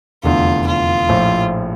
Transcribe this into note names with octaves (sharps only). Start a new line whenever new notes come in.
F1 E2 D3 F4
F4
A#1 A2 F3